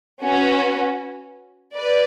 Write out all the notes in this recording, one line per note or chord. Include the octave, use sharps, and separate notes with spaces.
C#4 F#4 B4
B4 D5